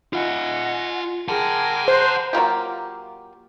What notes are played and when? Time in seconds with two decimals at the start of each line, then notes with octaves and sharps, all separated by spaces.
0.13 F4 D#5 E5 F#5 G#5
1.28 G#4 A#4 F#5 G5 A5
1.88 C5 A#5 F#6
2.33 F#3 A#3 F4 G4